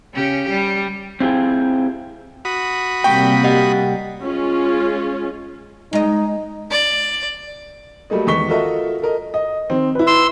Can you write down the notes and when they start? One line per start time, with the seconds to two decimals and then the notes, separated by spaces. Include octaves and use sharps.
0.14 C#3 C#4 G4
0.49 G3
1.20 C4 E4 F4 G4 G#4
2.45 F#4 B5 D#6
3.04 C3 G3 A#3 G5 C#6 B6
3.43 G4 D#5 F#5
4.23 G#3 C#4 F4
5.93 G#3 D#4 D#5
6.71 D5
8.10 F#3 G3 A3 A#3 D#5
8.27 E2 D#3 G#3 C#6 B6 G7
8.49 F4 F#4 A4 A#4 D#5 E5
9.02 A4 A#4 D#5
9.34 D#5
9.70 D#3 C4
9.95 E4 B4
10.07 C6 E6